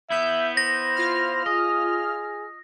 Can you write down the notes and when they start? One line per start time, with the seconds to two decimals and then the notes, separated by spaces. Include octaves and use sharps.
0.10 B3 E4 E5 G6
0.57 C5 A#6
0.96 F4 F6
1.46 G#4 D#5